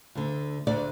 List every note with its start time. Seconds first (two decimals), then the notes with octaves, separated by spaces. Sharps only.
0.15 D2 D3
0.67 D2 D3 D5